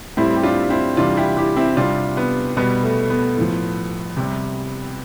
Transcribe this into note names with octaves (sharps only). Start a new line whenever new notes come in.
A2 G3 C4 E4
G4
D4 F4
C4 E4
C3 E3 G3 D4 F4
E4 G4
E4 G4
C4 E4
C3 G3 D4 F4
B3
B2 G3 B3
A3
B3
A2 F3
C3 G3